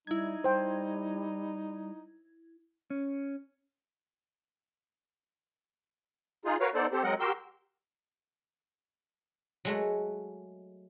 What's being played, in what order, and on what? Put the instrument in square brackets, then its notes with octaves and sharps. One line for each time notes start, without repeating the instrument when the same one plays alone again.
[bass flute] G3 [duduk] D#4 [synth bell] E4 G#6
[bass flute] G3 [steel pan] C5 G5
[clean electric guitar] C#4
[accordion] D#4 F4 G#4
F#4 A#4 B4 C#5 F5
B3 D#4 A4 C5 D5
C4 G4 A4 C5
F#3 G#3 C4 A#4 D#5 F#5
F#4 G4 A#4 C6 E6
[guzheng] F#3 G#3 A3